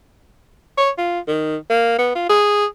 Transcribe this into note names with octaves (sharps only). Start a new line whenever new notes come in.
C#5
F4
D#3
A#3
B3
F4
G#4